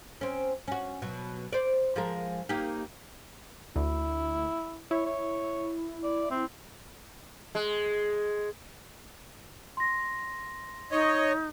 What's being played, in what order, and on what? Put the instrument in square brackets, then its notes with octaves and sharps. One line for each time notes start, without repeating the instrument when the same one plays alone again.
[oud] C4 C#4
C#4 F#4
B2 F#3
C5 D5
F3 G#3 A#4
A#3 D#4 G4
[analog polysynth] D2 [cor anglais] E4
[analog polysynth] E4 [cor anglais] C#5
[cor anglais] C#5
D5
C4
[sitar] G#3
[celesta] C6 A#6
[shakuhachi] D#4 [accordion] C#5 D#5